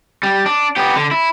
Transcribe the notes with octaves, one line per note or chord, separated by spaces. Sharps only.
G3
D4
B3 G4
D3
E4